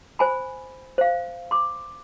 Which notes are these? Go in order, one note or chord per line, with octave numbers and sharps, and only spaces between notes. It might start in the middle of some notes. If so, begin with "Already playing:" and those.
C5 G#5 B5
C5 F5
C6 D6